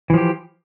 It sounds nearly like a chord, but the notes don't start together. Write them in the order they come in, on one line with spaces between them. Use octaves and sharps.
E3 F3 G4